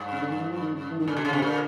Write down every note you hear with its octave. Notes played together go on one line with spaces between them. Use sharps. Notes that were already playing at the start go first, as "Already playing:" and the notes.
Already playing: G2
C#3
D3
D#3
E3
F3
D#3
C#3
E3
D#3
A#2 D3
B2
C#3
C3
A#2